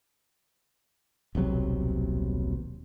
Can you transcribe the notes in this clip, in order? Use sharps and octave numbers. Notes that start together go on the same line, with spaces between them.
D#1 B1 C3 F#3